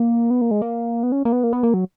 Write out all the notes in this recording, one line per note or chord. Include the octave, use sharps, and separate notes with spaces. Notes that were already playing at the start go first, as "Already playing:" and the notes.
Already playing: A#3
B3
A#3
G#3
A#3
B3
C#4
A#3
B3
A#3
B3
A#3
F#3